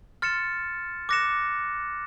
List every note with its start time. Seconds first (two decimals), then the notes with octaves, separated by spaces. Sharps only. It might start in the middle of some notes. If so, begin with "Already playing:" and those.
0.22 C6 F6 A6 C#7 E7
1.09 D6 F#6 A#6 C#7 E7